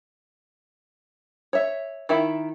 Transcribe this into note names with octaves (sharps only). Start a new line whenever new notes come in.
C#5 E5
D#3 E4 E5